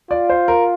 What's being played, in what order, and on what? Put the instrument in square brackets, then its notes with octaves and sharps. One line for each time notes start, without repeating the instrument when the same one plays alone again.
[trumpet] F4 [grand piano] D5
[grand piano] C5
A#4